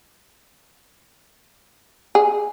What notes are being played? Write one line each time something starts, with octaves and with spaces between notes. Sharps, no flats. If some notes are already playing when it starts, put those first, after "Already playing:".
G#4